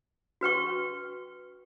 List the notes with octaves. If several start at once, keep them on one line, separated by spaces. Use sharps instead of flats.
F#4 B4 G5 C#6